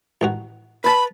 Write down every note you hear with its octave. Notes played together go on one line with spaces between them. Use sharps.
A1 D#3 F#4
B4 A5 B5